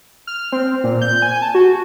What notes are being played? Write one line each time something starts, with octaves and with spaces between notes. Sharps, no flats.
F6
C4
A#2
G6
G#5
A5
F#4